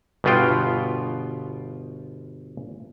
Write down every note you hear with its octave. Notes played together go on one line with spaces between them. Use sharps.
G1 B2 B3 F4 G5